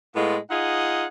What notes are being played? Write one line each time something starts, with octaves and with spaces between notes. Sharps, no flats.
A2 G#3 B3 F4
D#4 F4 G#4 D#5 F#5